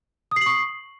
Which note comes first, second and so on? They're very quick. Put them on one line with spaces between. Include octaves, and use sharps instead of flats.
D#6 C7 F#7 C#6